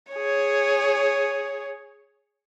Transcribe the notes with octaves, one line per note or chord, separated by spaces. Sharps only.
G#4 C#5